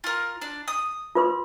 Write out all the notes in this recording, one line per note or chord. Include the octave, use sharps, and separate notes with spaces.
F4 A#4
D4
D#6
F4 B4 C6